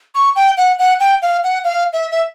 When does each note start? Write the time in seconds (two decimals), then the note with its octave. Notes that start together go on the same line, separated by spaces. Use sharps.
0.15 C#6
0.36 G5
0.57 F#5
0.79 F#5
1.00 G5
1.22 F5
1.44 F#5
1.64 F5
1.93 E5
2.11 E5